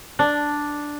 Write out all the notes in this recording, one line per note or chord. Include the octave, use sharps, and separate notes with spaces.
D4